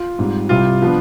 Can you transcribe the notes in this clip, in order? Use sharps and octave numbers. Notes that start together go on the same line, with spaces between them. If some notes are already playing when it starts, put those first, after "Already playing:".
Already playing: F4
G#2 G3 C4
C2 C3 G3 F4
F3 B3 D4